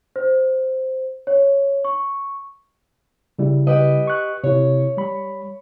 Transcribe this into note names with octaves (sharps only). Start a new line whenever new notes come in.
C5
C#5
C#6
C#3 G3 E4
G4 B4 D#5
C#6 F#6
C3 E4 C#5
G3 B5